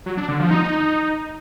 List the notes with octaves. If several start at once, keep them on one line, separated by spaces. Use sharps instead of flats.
F#3
D4
D3
F3
D#4